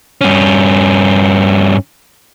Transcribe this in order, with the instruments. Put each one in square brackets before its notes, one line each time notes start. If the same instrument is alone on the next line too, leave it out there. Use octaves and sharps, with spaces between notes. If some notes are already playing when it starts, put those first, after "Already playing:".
[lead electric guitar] G2 C#4